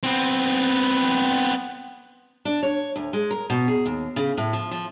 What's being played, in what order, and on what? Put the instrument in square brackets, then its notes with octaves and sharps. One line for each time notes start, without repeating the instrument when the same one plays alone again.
[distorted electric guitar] B3 C4
[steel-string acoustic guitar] D4
C#5
D2
G#3
A#4
B2
G#4
D#2
C#3
A2
F3
F3